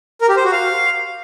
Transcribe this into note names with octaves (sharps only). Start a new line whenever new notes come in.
A#4
G4
C5
F#4
F5